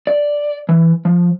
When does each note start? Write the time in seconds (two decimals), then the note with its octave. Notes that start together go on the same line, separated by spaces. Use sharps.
0.07 D5
0.69 E3
1.05 F3